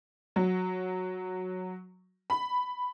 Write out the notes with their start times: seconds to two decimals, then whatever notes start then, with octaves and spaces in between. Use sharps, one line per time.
0.36 F#3
2.30 B5